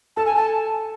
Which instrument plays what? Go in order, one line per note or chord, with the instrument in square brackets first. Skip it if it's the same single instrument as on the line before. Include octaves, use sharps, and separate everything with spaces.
[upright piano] A4 [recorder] A5
[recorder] G#5
A5